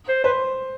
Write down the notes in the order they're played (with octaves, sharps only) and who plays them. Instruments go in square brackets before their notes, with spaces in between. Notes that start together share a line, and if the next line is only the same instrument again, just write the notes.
[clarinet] C5
[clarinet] B4 [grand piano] C5